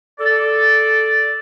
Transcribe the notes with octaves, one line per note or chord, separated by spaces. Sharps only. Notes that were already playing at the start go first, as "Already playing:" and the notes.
A4 D5